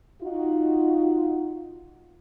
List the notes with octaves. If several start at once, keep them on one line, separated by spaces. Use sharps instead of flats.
D#4 F4 F#4